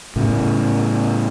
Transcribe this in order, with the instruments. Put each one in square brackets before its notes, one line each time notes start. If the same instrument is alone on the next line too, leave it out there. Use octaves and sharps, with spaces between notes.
[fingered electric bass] A2 C#3